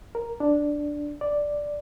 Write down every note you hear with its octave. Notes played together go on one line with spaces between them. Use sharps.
A#4
D4
D5